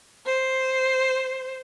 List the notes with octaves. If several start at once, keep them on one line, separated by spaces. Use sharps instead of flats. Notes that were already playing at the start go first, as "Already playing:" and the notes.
C5